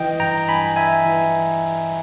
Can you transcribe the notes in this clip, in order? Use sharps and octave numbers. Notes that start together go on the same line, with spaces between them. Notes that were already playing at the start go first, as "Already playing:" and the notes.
Already playing: E3 D#5 G5
G2 G5 A#5
G2 G#5 B5
E3 E5 G#5
E3